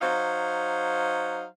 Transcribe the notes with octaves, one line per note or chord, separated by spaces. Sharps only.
F#3 D#4 C5 F5